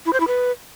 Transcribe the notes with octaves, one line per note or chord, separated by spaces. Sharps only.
E4
C5
E4
B4